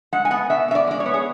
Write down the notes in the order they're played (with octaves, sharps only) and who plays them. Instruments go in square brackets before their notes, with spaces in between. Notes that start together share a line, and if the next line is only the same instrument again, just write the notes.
[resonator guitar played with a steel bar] G#3 F#5
G#5
B3 F#5
B2 E5
B2 E5
D5
G#3 D5
C#5
B3
G#4